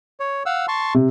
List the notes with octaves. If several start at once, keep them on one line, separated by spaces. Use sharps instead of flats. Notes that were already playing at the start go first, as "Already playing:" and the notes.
C#5
F5 F#5 E6
A5 C6 C#6
C3